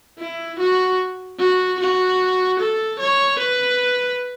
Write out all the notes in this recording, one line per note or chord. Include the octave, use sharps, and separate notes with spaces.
E4
F#4
F#4
F#4
A4
C#5
B4